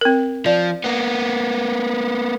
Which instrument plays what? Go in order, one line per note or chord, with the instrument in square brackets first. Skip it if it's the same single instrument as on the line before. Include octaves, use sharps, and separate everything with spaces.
[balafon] C4 A#4
[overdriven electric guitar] F3 [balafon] D5
[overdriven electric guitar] A#3 B3